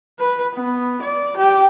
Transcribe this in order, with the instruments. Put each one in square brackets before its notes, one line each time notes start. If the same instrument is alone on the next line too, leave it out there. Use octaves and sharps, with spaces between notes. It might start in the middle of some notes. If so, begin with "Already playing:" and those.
[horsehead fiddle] B4
B3
D5
G4